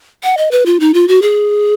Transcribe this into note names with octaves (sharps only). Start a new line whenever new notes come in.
F#5
D#5
B4
F4
D#4
F4
F#4
G#4